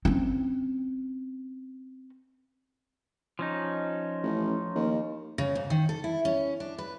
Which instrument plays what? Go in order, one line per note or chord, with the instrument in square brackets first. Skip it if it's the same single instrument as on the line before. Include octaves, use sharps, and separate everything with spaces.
[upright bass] C4 C#4
[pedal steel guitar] F3 C#4 D#4
[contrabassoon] A1
D#2
[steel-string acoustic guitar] C#3
G#2
D#3
A4
E4
C#4
D4
B4